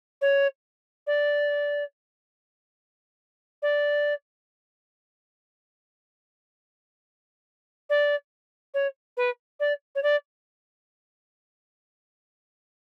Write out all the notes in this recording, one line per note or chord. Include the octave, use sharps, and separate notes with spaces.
C#5
D5
D5
D5
C#5
B4
D5
C#5
D5